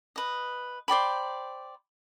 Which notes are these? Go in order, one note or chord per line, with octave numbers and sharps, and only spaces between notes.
B4 D#5
C5 D5 G5 B5